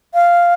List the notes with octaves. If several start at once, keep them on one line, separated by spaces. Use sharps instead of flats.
F5